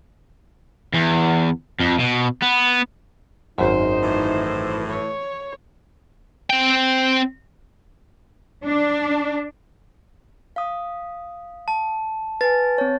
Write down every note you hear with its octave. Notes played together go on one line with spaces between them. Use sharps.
E2
F2
B2
B3
G#1 F#2 D#4 C5
A2 E3
C#5
C4 G5
D4
F5 D#6
A5
B4 G#5 A6
C4 C#5